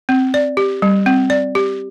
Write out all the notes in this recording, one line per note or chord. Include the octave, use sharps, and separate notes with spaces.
C4
D5
G4
G3
C4
D5
G4